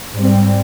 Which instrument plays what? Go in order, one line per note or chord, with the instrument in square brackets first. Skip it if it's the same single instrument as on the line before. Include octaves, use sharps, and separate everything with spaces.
[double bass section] G#2 G3 C4